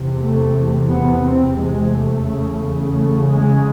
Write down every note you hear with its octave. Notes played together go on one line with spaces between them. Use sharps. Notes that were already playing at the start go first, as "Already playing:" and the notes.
Already playing: E2 C3
A3
B3
C4
G#3
A3
E2 C#3
A3
G#3